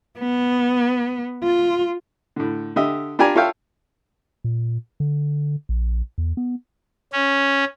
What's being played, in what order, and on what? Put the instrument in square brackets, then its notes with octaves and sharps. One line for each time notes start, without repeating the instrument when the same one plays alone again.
[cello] B3
F4
[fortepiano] A2 D3
D3 G4 D#5 E5
D4 F4 G4 D5 G#5 A#5
F4 A4 C#5 E5 F5 G5
[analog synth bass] A#2
D3
A#1
E2
B3
[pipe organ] C#4